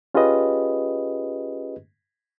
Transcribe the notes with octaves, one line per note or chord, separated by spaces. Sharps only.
C#4 F4 G4 G#4 B4 D#5